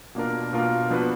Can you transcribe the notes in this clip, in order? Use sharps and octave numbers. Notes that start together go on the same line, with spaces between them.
B2 A#3 D4 F4 A#4
B2 A#3 D4 F4 A#4
F3 B3 D4 F#4 B4